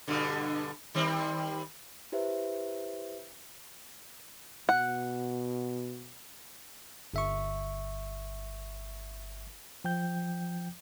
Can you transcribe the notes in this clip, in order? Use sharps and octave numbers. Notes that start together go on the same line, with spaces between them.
G2 B2 D3
D#3 G3 C4
E4 G4 B4 C5 E5
B2 F#5
G1 E5 C#6
F3 G5 G6